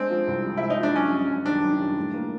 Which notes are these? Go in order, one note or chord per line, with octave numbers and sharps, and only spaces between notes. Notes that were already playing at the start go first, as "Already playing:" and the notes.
Already playing: G#3 C4 D4
F3
C2
C3
G#3 E4
D#4
F3
D4
F#2 C#4
G3
F#2
D#3 D4
F#2
G3
A2
A#3